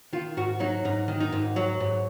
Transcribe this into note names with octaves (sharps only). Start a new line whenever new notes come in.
D#3 F4
G#2 F#4
F#3 D#4
G#2 D#4
D#3
D#4
G#2
F#3
G#2